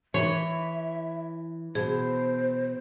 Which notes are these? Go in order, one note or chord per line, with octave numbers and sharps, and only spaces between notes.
E3 C#5 E5
B2 G#4 C5